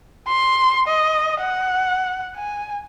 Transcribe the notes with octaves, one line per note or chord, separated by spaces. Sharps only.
C6
D#5
F#5
G#5